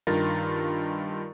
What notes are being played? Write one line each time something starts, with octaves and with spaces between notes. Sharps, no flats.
G2 D#3 F4 A#4 A6